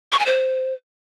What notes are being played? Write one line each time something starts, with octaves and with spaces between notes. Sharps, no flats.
C#6
G#5
C5